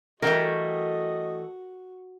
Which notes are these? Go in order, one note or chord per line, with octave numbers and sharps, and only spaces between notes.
E3 G3 A3 F#4 A#4 D#5 G5